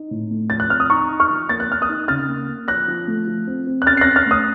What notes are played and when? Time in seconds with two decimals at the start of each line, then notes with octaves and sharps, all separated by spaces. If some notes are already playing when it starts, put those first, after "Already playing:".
Already playing: D#4
0.11 A2
0.31 A3
0.50 F3 A6
0.60 F#6
0.70 C4 F6
0.80 D#6
0.90 D#4 A#5 C#6
1.10 D#4
1.20 C#6 F6
1.30 F3
1.49 A#3 A6
1.60 F#6
1.69 A#3 F6
1.82 D#6 F#6
1.89 D#4
2.08 C#3 F6 A6
2.28 A#3
2.49 A#3
2.68 F3 F#6 A#6
2.88 F3
3.08 A3
3.27 F3
3.47 C4
3.67 C4
3.82 F#6
3.86 C#4 F6 A6
3.97 C7
4.01 C#4 F#6 A#6
4.16 F6 A6
4.26 A3 D#6 F#6